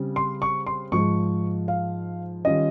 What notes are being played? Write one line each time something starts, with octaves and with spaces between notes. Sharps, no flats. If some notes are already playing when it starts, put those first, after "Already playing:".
Already playing: C#3 G3 C4
C6
C#6
C6
G#2 F3 G#3 C#6
F5
D#3 G3 C#4 F4 D#5